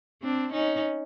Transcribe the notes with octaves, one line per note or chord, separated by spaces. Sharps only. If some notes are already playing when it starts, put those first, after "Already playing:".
C4 D4
C#4 D#4